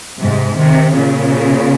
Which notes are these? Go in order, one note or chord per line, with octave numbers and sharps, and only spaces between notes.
G#2 C3
C3 D#3
A#2 C#3